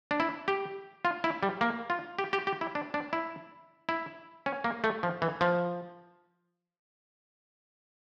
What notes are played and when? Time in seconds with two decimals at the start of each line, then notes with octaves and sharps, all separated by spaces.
0.11 D4
0.20 E4
0.48 G4
1.05 F4
1.24 E4
1.43 G3
1.61 A#3
1.90 F4
2.19 G4
2.33 G4
2.47 G4
2.61 E4
2.75 D4
2.94 D4
3.13 E4
3.89 E4
4.46 C#4
4.64 A#3
4.84 A3
5.03 F3
5.22 E3
5.41 F3